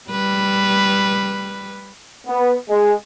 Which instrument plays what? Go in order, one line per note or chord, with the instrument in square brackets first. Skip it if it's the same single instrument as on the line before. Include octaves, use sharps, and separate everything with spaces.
[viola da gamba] G3 B4
[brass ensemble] B3
G#3